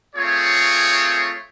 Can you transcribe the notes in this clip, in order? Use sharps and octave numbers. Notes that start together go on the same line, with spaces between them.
A3 C4 F4 G#4 C#5